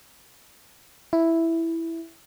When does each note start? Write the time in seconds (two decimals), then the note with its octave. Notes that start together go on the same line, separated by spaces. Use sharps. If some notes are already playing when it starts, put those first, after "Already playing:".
1.13 E4